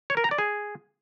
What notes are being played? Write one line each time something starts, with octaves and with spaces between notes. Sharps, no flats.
C#5
A#4
A#5
D5
G#4